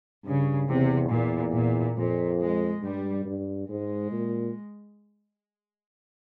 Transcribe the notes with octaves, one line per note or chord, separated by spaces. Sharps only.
G2 C#3
E2 C3
E2 A#2
A#2
F2 A#2
G#3
G2 G3
G2
G#2 G#3
A#2